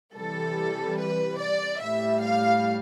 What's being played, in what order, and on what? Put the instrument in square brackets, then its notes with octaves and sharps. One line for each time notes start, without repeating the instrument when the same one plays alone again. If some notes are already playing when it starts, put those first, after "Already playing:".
[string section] C3 E3 G3 A4
B4
D5
A2 G3 E5
F5